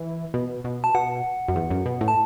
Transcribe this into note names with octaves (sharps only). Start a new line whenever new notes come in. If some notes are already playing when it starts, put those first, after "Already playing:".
Already playing: E3
B2
B2
A5
B2 F#5
F#2
E2
F#2
B2
A2
A5